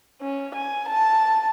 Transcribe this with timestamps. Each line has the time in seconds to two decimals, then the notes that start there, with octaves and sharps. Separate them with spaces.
0.21 C#4
0.55 G#5
0.89 A5